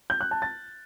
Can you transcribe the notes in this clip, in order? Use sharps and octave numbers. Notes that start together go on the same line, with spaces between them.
G6
F#6
A5
A6